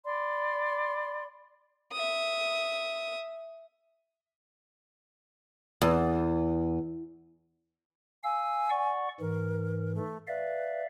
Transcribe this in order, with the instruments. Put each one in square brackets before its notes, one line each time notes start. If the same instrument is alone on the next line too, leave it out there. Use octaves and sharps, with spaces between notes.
[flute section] D5 B5 C6
[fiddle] E5 D#6
[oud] E2
[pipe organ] F5 E6 [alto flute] G#5
[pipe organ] D5 F#5 C#6
[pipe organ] G#2 E3 [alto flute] A#4
[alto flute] A3
[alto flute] B4 [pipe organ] D5 E5 F5